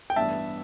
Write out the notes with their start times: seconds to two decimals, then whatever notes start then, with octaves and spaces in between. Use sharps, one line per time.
0.10 G5
0.16 A1 G2 G3 B3 E5 A5